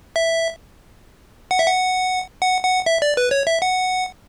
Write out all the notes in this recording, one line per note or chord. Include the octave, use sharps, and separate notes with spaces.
E5
F#5
E5
F#5
F#5
F#5
E5
D5
B4
C#5
E5
F#5